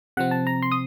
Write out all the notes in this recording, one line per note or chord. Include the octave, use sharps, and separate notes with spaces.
C3 F3 C4 F#5
A5
A#5
C6
D#6